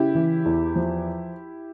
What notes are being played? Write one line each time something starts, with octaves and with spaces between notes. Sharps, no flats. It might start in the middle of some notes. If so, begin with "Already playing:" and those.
Already playing: C#3 E4 G4
E3
E2
F3